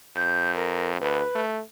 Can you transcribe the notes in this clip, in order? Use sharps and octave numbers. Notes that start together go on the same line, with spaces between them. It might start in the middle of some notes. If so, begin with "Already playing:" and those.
F2 G6
A#4
D2 B4
A3